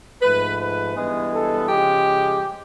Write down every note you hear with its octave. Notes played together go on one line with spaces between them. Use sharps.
G#2 F3 A3 B4
B4
G2 E3 G#3 B3
A4
C#3 F3 G#3 G4